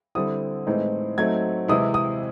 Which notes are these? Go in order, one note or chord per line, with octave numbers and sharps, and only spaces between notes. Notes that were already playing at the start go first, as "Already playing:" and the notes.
D3 G3 C4 E4 D#6
A2 E3 G#3 C4 D#4
F#3 A3 C4 D#4 G#6
C3 E3 G#3 C4 E4 D#6
D#6